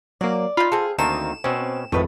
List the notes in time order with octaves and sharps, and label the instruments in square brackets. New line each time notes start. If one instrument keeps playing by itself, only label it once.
[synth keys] F#3 A#3 [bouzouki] D5
[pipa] D#4 B5 [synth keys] F4 [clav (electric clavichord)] F5
[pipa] C4 A4 [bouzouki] G#4
[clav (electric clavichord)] D2 C4 [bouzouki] D#3 A#3 D#4 [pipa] A4 [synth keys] E7
[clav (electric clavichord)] B2 C#4 [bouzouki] C4
[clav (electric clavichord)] G#1 A2 [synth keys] F2 [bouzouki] A3 B4 D#5